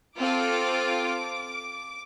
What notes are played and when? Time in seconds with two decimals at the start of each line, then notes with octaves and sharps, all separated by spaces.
0.18 C4 F4 A4 D6